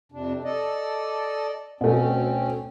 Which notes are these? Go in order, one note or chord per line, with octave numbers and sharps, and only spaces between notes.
F2 C3 D4
A4 D5 D#5
D2 B2 A3 C4 C#4